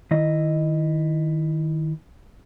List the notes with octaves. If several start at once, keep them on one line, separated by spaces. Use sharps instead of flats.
D#3 E4 D#5